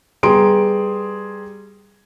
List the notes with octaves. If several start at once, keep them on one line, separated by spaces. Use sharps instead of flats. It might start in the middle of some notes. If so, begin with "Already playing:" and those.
G3 B3 G#4 A#5 C6 D7